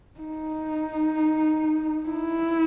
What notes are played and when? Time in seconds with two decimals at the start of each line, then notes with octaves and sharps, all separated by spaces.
0.21 D#4
2.10 E4